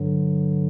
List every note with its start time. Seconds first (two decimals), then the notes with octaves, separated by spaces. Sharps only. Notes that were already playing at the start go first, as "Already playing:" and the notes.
Already playing: G2 D3 F#3